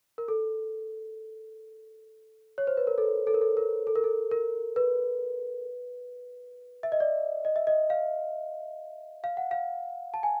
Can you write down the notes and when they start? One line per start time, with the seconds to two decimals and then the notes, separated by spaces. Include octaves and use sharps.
0.18 A#4
0.28 A4
2.58 C#5
2.67 C5
2.77 B4
2.87 A#4
2.98 A4
3.27 A4
3.34 A#4
3.42 A4
3.57 A#4
3.87 A4
3.96 A#4
4.04 A4
4.31 A#4
4.76 B4
6.83 E5
6.92 D#5
7.00 D5
7.45 D#5
7.56 E5
7.67 D#5
7.90 F5
9.24 F5
9.37 F#5
9.51 F5
10.14 A5
10.23 G#5